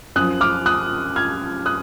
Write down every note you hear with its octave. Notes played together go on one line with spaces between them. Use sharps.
F#2 F3 D#6 F#6
D6 F6
D#6 F#6
F6 G#6
D#6 F#6